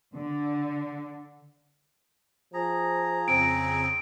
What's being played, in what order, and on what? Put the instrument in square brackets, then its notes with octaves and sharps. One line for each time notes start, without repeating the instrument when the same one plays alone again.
[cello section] D3
[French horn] F3 [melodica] G#4 A#5
[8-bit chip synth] F2 C#3 C4 [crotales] D7